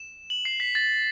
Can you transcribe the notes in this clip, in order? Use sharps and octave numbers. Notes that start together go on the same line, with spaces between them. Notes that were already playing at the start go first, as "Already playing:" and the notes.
Already playing: E7
F#7
C7
B6
A6